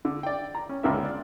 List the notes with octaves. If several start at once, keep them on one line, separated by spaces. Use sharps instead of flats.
D3
D5 G5
A#5
C#4
C#2 A#2 D3 B3 A#4 E5
D5